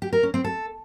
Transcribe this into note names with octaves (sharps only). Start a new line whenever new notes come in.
G4
A#4
C#4
C4
A4